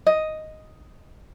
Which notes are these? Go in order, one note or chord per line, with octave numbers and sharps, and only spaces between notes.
D#5